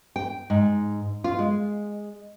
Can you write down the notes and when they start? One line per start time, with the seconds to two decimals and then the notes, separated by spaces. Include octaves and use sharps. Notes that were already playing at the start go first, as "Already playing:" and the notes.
0.16 G5
0.50 G#2
1.24 F4
1.39 G#3